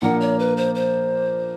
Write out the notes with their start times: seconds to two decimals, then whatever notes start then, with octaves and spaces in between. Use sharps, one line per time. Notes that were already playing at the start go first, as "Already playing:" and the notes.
0.02 A#2 F3 A#3 D4 F#5
0.20 C#5
0.39 B4
0.57 C5
0.75 C5